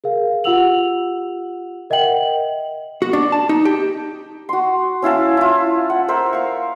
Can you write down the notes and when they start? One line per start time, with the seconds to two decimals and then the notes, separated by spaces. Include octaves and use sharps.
0.04 G#4 A#4 F5
0.44 F4 G4 F#5 E6 F7 F#7
1.90 A#4 D#5 E5 F#5 G5 F#7
3.02 F#4
3.13 D4
3.32 A5
3.49 D#4
3.65 G4
4.49 F#4 C6
5.02 C#4 E4 F5 A5
5.37 E4 F4
5.90 F#5
6.08 A#4 C5 E5
6.33 F5 C#6